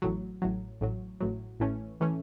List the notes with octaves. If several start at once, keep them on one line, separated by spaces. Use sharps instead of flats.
A1 A2 F#3
A1 A2 F#3
A1 A2 F#3
A1 A2 F#3
A1 A2 E3 A3 C#4
A2 E3 A3 C#4